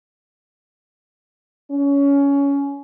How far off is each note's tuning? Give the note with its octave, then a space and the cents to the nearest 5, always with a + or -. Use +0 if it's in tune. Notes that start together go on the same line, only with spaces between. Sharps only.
C#4 +20